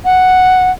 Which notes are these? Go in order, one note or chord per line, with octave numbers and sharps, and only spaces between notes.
F#5